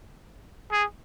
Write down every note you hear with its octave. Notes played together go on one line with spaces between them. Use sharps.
G#4